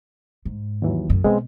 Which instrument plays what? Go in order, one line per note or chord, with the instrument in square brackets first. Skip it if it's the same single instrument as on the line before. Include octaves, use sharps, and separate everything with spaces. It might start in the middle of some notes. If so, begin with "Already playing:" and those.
[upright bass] G#2
[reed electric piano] D#2 E3 F#3
[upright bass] F#2 A2
[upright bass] B2 [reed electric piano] G#3 B3 C4